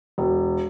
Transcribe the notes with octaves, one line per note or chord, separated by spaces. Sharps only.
E1